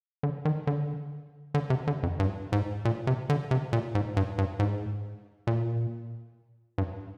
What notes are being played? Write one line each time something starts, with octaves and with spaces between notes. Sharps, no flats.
D3
D#3
D3
D3
C3
D3
F2
G2
G#2
A#2
C3
D3
C3
A#2
G#2
G2
G2
G#2
A#2
G2